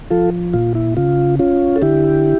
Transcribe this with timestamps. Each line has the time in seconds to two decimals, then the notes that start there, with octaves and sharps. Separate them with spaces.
0.10 F3 F4 A4
0.53 A#2 F4
0.75 E4
0.97 C#3 F4
1.39 C#4 F4
1.76 A4
1.82 D3 E4 G4